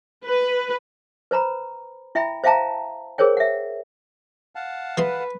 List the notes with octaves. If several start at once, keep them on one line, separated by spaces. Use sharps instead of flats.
B4
B4 C5 A#5 B5
E4 E5 G5 B5
C5 E5 F5 G5 A5 A#5
G#4 A#4 C5 C#5 G5
E5 F#5
F5 F#5 A5
E3 G#4 B4 C6